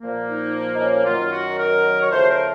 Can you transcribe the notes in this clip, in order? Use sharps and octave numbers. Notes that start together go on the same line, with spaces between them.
A#2 F3 A#3
D#4
D#4
C#4
F#2 D#3 F#3 F4
F#4
A#4
C#5
C#2 C#3 F3 A3 C5
A#4